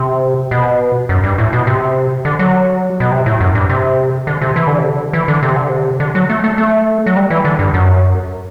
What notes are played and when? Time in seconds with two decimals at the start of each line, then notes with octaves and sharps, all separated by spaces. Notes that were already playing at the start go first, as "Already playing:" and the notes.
Already playing: C3
0.51 B2
1.09 F#2
1.24 G2
1.38 A2
1.53 B2
1.67 C3
2.25 D3
2.39 F#3
3.00 B2
3.11 C3
3.26 A2
3.41 F#2
3.55 G2
3.69 C3
4.27 D3
4.41 C3
4.56 E3
4.67 D3
4.78 C3
4.89 D3
5.13 E3
5.28 D3
5.43 C3
5.56 D3
5.69 C3
6.00 D3
6.15 F#3
6.29 A3
6.44 A3
6.58 A3
7.06 F#3
7.16 G3
7.30 E3
7.45 D3
7.59 G2
7.74 F#2